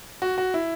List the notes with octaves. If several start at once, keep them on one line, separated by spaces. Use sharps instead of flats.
F#4
F#4
E4